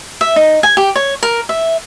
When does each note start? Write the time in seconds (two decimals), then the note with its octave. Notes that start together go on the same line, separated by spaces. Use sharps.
0.21 E5
0.36 D#4
0.63 G#5
0.77 G4
0.96 C#5
1.23 A#4
1.49 E5